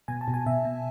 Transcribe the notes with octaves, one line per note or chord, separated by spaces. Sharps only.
B2 G#5
A5
B2
G#5
B2 E5
B2